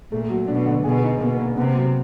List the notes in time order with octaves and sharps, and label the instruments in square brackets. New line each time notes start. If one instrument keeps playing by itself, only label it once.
[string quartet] A#2 [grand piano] A3
[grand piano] F#3
[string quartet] B2 [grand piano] D4
[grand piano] D3
[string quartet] B2 [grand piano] G#4
[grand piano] D#4
[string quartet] B2 [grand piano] A#3
[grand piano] A#3
[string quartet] C3 [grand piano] B3
[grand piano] F#3